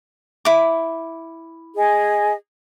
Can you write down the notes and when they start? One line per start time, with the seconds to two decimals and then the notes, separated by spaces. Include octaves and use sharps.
0.45 E4 D6
1.76 G#4 D#5 G#5